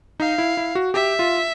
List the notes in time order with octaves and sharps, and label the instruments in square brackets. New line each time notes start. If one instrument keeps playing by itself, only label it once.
[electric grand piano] D#4 [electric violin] F5
[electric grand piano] E4
E4
F#4
[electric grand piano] G4 [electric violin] E5
[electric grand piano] F4